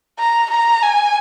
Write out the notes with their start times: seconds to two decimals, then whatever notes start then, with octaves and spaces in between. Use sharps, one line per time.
0.19 A#5
0.51 A#5
0.82 G#5